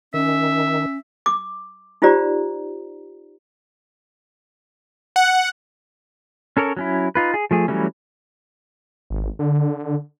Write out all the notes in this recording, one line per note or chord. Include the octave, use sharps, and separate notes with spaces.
D#3 C#4 E5
D6
D#4 F4 G4 C5 D5 A#5
F#5
C#4 A4 A#4 C#5
F#3 C#4 E4
D#4 F4 B4
G#4
F3 A3 G#4
E3 F#3 G3 A3 C#4
G#1
D3